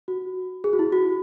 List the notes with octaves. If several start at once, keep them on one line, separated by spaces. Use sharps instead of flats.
F#4
G#4
F#4
E4
F#4